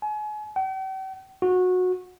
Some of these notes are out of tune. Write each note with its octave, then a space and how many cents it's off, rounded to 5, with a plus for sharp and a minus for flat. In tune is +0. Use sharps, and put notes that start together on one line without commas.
G#5 +35
G5 -45
F#4 -20